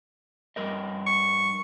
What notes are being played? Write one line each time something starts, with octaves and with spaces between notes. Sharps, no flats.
G2 A#4 D#5
C#6